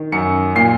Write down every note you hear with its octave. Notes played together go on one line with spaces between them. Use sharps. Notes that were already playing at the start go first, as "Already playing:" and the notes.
Already playing: D#3
F#2 C#7
A#2 C7